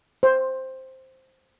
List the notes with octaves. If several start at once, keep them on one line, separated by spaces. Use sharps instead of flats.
C5